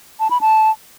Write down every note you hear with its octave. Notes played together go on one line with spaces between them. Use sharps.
A5
B5
A5